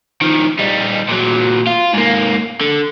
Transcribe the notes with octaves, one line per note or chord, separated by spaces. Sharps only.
D#3 F3
G3 D#4
A#2 F#3
F4
G#2 A#3
D3